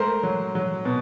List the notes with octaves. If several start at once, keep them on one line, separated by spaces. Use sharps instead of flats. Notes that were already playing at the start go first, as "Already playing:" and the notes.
Already playing: G#3 A3 A#4 C5
F#3
F#3
B2